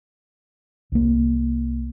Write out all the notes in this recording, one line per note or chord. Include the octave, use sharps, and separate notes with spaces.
C2 A#3